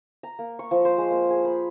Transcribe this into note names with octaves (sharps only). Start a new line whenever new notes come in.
A#5
A#3
C#6
F3
C5
G#3
A#3
G#4
B5